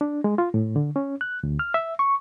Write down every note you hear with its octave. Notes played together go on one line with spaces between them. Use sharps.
D4
G#3
F4
A2
D3
C#4
F#6
D2
F6
E5
C#6